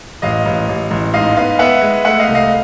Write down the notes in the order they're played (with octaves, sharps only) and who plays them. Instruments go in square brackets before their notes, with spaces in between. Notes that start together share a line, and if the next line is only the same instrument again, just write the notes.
[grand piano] A1 D#5 F5
A1
A1
A1
G#2 D#5 F5
B3 D#5 F5
B3 E5 F#5
G#3
A3 E5 F#5
D#5 F5
C2
D#5 F5